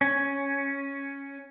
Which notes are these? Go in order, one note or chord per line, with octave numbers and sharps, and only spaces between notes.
C#4